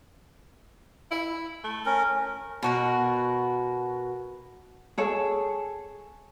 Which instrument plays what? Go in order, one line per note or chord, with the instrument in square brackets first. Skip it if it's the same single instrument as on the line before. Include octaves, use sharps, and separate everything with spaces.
[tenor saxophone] E4
A3
[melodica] C#4 A#4
[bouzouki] B2 F#4 A#4
[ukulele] G#4 A4 C#5